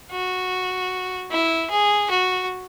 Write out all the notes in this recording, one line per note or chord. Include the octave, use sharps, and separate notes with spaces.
F#4
E4
G#4
F#4